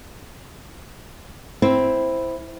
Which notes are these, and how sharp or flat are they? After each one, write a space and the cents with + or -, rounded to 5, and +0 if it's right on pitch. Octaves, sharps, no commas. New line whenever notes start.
C4 +0 E4 +0